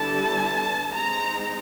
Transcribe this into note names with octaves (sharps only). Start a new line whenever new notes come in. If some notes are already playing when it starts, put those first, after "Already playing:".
Already playing: D3 G3 B3 E4 A5
G#3 C4 D#4 A#5